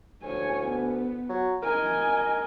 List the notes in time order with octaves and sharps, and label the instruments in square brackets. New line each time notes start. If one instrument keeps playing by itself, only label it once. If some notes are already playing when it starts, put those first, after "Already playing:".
[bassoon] D2 [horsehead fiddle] C#5 G#5
[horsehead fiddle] B3
[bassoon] F#3
[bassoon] A#4 [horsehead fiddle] D#5 G#5